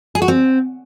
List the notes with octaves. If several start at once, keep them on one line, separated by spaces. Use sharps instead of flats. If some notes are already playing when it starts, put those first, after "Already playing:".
G#4
F#4
C4